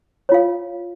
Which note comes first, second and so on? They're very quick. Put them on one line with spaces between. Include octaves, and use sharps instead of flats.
C#5 F4 F5